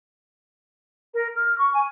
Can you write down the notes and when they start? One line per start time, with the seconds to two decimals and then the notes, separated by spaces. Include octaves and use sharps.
1.13 A#4
1.36 F6
1.59 C#6
1.74 G#5